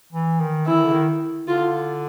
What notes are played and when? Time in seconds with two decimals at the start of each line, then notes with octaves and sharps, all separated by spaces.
0.13 E3
0.40 D#3
0.67 E3 E4
0.75 D#3
0.84 D3
0.92 D#3
1.48 D3 F4